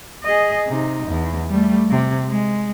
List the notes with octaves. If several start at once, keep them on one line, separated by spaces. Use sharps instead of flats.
G#4 D#5
C3 D#4
E2
G3 A3
C3
G#3